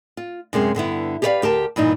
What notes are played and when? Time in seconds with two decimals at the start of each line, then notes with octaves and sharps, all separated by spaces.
0.17 F4
0.53 F#2 C3 G#3 C#4
0.75 G2 D3 B3 E4
1.22 G4 G#4 B4 C#5 D5 F5
1.42 D2 G4 A#4 A5
1.76 G2 A#2 E3 D#4